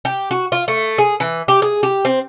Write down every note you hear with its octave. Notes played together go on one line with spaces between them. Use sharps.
G4
F#4
F4
A3
G#4
E3
G4
G#4
G4
C4